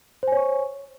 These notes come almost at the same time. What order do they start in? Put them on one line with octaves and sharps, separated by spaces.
C5 G#5 C#5 C#6